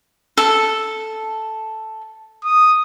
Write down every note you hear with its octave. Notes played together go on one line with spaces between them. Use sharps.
A4
D#6